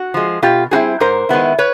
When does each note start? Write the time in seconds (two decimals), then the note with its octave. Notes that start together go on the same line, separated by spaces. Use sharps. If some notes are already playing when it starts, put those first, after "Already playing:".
Already playing: F#4
0.14 F3 G#3
0.42 B2 F4 G4
0.71 G3 C4 E4 F#4 G#4
1.00 G#2 A#4 C5
1.29 D#3 G#3 B3 E4
1.59 B4 C#5